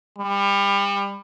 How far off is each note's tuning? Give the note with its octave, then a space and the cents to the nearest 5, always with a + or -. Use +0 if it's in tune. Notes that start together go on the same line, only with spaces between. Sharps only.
G3 +30